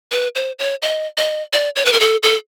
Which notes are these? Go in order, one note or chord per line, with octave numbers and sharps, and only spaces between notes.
B4
C5
C#5
D#5
D#5
D5
C#5
B4
A#4
A4
A4